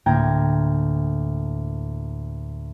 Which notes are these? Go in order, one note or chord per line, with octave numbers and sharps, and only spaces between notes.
D2 A2 A#3 G5 A#5 G#6